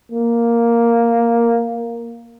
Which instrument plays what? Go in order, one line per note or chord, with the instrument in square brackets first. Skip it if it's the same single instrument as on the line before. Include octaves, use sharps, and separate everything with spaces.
[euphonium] A#3